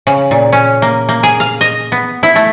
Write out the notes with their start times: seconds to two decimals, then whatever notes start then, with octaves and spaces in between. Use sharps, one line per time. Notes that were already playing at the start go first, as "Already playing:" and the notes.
0.07 C#3
0.31 A#2
0.52 C#4
0.82 A#3
1.09 A#3
1.23 G#4
1.40 F5
1.61 D#5
1.92 B3
2.23 E4
2.36 A3